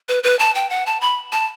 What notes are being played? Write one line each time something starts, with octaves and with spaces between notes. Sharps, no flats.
B4
B4
A5
G5
F#5
A5
B5
A5